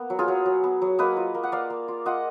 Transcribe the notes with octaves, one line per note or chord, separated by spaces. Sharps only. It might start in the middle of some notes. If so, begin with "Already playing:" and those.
Already playing: A#3 B3
F#3
F4 G#4
F#3
F#3
B3
F#3
A#3 B4 D#5
F4
A#3
F#5
A#3 D5 F5
A#3
F4
F4 D#5 F#5